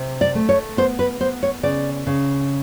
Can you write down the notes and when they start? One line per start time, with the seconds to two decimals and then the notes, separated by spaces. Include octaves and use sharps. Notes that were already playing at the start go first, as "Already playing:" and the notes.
Already playing: C3
0.21 D5
0.35 A3
0.49 C#5
0.77 B3 C5
0.99 B4
1.20 B3 C5
1.43 C#5
1.63 C#3 D5
2.07 C#3